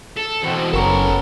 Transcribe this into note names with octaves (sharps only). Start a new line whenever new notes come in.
A4
E2 B2 C4 F#4 C5
F#1 B3 C#4 A4 A#4 A#5 C#6